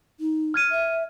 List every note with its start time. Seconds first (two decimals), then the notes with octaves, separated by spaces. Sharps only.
0.20 D#4
0.54 F6 G#6 D#7
0.72 E5